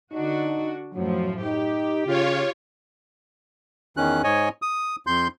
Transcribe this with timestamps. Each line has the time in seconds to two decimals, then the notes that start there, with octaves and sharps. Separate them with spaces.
0.12 D3 D4 D#4 F#4
0.94 F#2 A2 F3 F#3
1.43 D#4 G4
2.06 C#3 F4 C#5
3.97 E2 D#3 C#4 F#6
4.24 G#2 C#5 D#5 G#5
4.62 D#6
5.07 F2 C6 G6